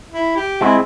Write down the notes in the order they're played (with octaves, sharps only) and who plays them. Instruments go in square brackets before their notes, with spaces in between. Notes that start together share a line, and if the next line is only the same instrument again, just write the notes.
[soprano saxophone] E4
G4
[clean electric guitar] G#3 C4 [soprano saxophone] E4